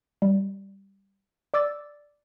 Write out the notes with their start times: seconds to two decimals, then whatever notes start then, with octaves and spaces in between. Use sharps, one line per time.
0.22 G3
1.54 D5 D6 E6 A6